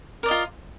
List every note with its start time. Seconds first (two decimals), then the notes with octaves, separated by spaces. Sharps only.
0.23 A#4
0.26 D5
0.28 D#5
0.31 F4